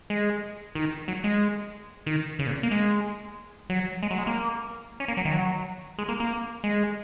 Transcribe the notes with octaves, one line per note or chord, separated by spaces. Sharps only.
G#3
D#3
F#3
G#3
D#3
C#3
A#2
A#3
G#3
F#3
G#3
F#3
G#3
A#3
C#4
A#3
F#3
D#3
F#3
G#3
A#3
A#3
G#3